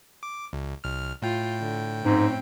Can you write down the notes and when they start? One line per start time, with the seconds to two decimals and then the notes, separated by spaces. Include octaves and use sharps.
0.23 D6
0.53 C#2
0.84 C2 F6
1.22 A2 F4 G5
1.60 D3
2.04 F2 G#2 C4 C#4